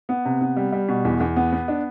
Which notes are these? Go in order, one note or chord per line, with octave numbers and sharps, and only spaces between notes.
B3
C3
B3
G3
G3
B2
E2
E2
B3
B3
D4